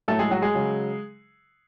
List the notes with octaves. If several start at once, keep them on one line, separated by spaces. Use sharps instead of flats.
A2 F#3 A3 A4
G#3 G#4
F#3 F#4
G#3 G#4
C#3 F#3